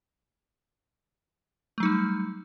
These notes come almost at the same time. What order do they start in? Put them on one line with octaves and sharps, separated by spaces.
A3 F#3 D#4 G3